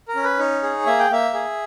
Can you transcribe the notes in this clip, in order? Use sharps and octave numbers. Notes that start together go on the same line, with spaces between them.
A#4
C#4
B4
D#4 C#5
G#4
A#3 E5
G5
A#3 E5
G#4